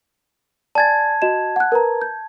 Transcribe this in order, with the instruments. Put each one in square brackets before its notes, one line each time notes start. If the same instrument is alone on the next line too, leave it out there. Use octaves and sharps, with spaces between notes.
[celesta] D5 G#5 A6 [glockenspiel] A5 G#6
[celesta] F#4 D#5 E7
F#5 F#6
A#4 B4 A#5
G6